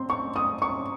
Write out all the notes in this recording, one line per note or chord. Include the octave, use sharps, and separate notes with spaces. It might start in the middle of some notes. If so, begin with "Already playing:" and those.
Already playing: C4 C6
C#6
D#6
C#6